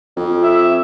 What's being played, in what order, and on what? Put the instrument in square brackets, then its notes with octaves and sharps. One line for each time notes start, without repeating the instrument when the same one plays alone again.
[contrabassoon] F2
[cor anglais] E5